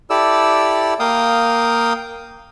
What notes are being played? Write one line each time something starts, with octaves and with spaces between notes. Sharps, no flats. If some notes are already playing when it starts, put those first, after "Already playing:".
E4 G4 A4 D5 E6
A#3 F5 G5 D#6